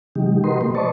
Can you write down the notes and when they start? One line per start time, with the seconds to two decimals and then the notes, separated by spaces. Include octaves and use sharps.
0.15 C3 E3 F#3 G#3 D#4 G4
0.44 F#4 G4 A#4 B4 D#5 C6
0.61 B2 F3 A3 A#3
0.75 B4 C5 D5 D#5 A5 C#6